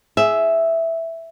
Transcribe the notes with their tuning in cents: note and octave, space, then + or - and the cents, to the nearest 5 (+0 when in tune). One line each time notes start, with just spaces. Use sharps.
G#4 +15 E5 +0